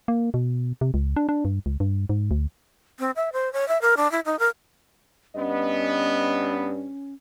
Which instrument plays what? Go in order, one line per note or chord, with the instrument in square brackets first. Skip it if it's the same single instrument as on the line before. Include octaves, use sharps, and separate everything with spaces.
[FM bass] A#3
B2
C3
C#2
D4
D4
G2
C#2
G2
G#2
D2
[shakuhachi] C4
E5
C5
C#5
E5
A#4
D4
E4
D#4
A#4
[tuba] G2 [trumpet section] B3 [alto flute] C#4 [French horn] D#5